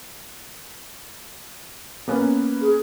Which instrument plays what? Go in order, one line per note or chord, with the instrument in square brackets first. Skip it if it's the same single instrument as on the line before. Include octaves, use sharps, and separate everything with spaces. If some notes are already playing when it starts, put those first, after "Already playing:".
[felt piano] A#3 B3 C#4
[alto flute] G#4